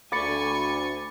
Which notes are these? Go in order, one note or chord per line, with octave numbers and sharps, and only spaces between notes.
D2 G#5 B5 C#6 D6 A6 C#7